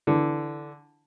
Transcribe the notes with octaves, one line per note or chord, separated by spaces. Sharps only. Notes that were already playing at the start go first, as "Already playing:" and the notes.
D3 E3